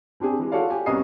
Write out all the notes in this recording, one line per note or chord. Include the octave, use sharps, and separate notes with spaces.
C4 D4 G4 G#4
E3 G#3
F4 F#4 A4 C#5 D5 F5
G4 G#5
C2 B3 C#4 D#5 D#6 C7